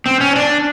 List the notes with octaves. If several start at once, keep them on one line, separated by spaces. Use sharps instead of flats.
C4
C#4
D4